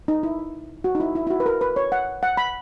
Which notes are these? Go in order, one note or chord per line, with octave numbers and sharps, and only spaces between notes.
D#4
E4
F#4
D#4
E4
E4
E4
F#4
B4
A#4
B4
C#5
F#5
F#5
B5